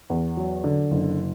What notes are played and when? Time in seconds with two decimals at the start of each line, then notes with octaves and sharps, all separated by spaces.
0.10 E2
0.37 F#3
0.64 D3
0.91 F#1